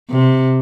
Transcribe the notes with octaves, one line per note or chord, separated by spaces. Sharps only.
C3